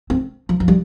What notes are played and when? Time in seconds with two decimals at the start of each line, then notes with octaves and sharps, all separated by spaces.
0.10 C4
0.49 F3
0.60 F3
0.68 G3